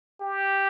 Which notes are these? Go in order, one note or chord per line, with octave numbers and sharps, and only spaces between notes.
G4